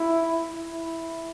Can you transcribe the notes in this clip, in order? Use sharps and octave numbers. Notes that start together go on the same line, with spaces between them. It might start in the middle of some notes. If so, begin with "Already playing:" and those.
Already playing: E4
E4